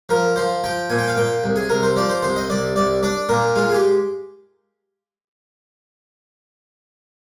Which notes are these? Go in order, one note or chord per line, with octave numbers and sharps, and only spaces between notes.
F3 A#4
F3 C5
F3 G5
A#2 G#5
G5
F5
A#2 G5
C2
G#4
C2 A#4
C5
F3 D5
C5
C2 C5
D#5
C2 D5
C2 D5
D4 D5
A#2 A#4
G#3 F4
G#4
G4